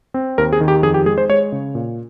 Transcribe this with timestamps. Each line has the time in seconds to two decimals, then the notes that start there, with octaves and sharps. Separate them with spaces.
0.14 C4
0.38 D#2 A#4
0.53 G#4
0.61 D#3
0.68 G4
0.83 F2 G#4
0.94 G4
1.06 G#3 G#4
1.18 C5
1.29 G#3 C#5
1.52 C#3
1.75 A#2